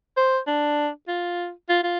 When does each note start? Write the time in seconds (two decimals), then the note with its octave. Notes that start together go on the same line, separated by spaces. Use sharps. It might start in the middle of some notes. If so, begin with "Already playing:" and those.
0.17 C5
0.47 D4
1.08 F4
1.69 F4
1.84 F4